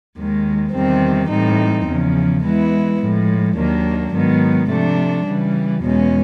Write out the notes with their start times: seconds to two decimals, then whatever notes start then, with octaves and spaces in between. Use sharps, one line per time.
0.16 D#2 D#3 G#3
0.72 E2 C3 D#3 G3 C4
1.29 A2 E3 G3 C4 D#4
1.85 E2 C#3 F3
2.42 E3 G#3 B3 E4
2.99 A2 F3 G#3
3.55 D#2 D#3 F#3 A#3 D4
4.12 G#2 D#3 F#3 B3
4.68 C3 F3 A3 D4
5.25 C#3 E3 G3
5.82 E2 B2 G#3 C#4